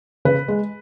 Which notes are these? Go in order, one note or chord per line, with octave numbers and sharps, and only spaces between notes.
C#3 B4
G#3